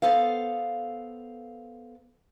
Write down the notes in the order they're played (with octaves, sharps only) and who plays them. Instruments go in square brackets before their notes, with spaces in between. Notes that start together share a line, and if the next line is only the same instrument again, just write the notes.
[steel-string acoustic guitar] B3 A4 C5 F5